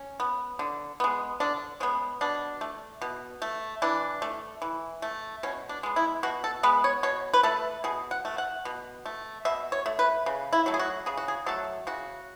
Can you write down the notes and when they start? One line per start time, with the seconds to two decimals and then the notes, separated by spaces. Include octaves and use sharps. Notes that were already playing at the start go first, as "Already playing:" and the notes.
Already playing: C#4
0.20 B3
0.59 D3
1.00 G#3 B3
1.40 D3 D4
1.80 G#3 B3 C#4
2.21 B2 D4
2.61 A3
3.02 B2
3.42 A3
3.82 E3 D4
4.22 A3
4.62 E3
5.02 A3
5.43 B2 C#4
5.69 D4
5.83 G#3 B3
5.96 E4
6.23 B2 F#4
6.44 A4
6.63 G#3 B3 B4
6.84 C#5
7.03 B2 C#5
7.33 B4
7.43 A3 A4
7.84 B2 G#4
8.11 F#5
8.25 A3
8.38 F#5
8.65 B2
9.06 A3
9.45 B2 E5
9.72 C#5
9.86 A3
9.99 B4
10.26 C#3
10.53 E4
10.66 F#3 A3
10.74 G#4
10.79 F#4
11.06 C#3 G#4
11.17 F#4
11.28 G#4
11.46 F#3 A3 A4
11.87 C#3 F#4